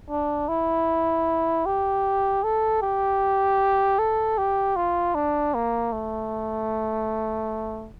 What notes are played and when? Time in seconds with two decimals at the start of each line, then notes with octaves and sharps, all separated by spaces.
0.10 D4
0.49 E4
1.66 G4
2.44 A4
2.82 G4
3.99 A4
4.38 G4
4.76 F4
5.15 D4
5.54 A#3
5.92 A3